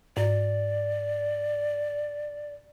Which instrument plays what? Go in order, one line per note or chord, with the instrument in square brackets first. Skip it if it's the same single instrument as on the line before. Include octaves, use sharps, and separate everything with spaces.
[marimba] G#2 [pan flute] D5